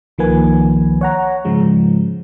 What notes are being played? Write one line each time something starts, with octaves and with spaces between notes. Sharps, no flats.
C2 D#3 F3 A#3 B4 G#5
C#5 F#5 A#5
G#2 C#3 F3 G#3